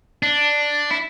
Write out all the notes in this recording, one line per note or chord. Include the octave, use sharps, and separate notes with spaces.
D4
E4